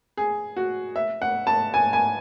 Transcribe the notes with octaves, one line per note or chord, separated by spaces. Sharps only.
G#4
F#4
E5
F#5
A5
G#5
G#5